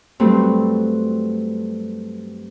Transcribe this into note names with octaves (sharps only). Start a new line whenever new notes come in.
G2 F#3 A3 C4